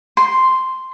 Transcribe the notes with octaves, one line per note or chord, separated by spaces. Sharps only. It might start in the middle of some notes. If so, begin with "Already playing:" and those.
C6